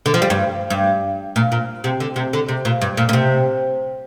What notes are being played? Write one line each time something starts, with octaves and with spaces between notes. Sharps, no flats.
D3
F3
G3
G2
G2
A#2
A#2
C3
D3
C3
D3
C3
A#2
G2
A#2
A#2
C3